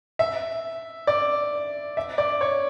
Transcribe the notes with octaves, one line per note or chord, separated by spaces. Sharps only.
E5
D5
E5
D5
C#5